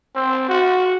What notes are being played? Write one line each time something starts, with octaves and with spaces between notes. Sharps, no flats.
C4
F#4